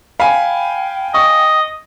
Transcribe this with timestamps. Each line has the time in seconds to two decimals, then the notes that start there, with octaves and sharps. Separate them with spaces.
0.20 F5 G5 G#5 B5
1.14 D#5 C#6